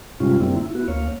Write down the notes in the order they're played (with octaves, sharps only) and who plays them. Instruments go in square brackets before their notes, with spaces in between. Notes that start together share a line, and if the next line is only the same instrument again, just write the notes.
[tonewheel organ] G2 C3 G3 G#3 C#4 F4
F#2 D3 G3 A#3 C4 E4
E4
B3 E4 F#4
D2 A#3 C#5 F5